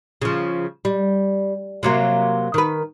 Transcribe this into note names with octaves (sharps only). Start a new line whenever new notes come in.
C#3 F3
G3
C3 F#3 A#3
D#3 B4